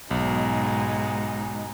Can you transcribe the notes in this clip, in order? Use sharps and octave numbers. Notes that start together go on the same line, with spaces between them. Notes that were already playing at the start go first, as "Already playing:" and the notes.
B1 G#2 G#3 D#4